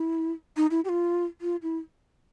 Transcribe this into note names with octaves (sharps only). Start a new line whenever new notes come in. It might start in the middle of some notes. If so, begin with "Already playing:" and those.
Already playing: E4
D#4
E4
G4
F4
F4
E4